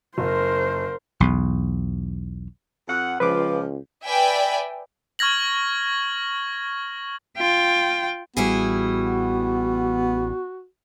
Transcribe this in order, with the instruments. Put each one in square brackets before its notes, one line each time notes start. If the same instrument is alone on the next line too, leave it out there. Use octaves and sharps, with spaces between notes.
[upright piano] F#1 [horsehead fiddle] A#4 C5
[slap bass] B1 E2
[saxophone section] F2 F#5
[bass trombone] C#2 [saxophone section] F3 [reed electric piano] B4 D6
[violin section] B4 D5 E5 G5 G#5
[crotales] C#6 F6 G#6 A#6 F#7
[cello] F4 G5
[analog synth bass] A1 [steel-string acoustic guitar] G3 E4 G#4 [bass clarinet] B3 [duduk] F#4